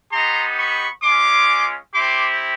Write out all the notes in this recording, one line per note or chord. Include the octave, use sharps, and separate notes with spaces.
B3 D#4 G4 A#5 C6
B5 C#6
G#3 C#4 F4 C6 D6
C4 E4 G4 C6 D6